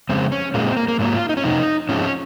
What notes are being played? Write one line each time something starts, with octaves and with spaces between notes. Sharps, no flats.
F2 C#3 G#3 C4
C#4
A#2 G#3 A#3
C4
A#3
A#3
G#2 F#3 A#3
F4
D#4
C#4
F2 C3 D#4
G#2 F3 G#3 C#4
C#4